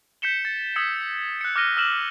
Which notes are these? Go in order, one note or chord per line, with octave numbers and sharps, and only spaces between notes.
G6 B6 C#7 E7 G7
A6
D#6 E6 G#6 B6 C#7
F#6 C#7
D6 F6 F#6 A#6 D#7 G7
E6 F6 E7 F#7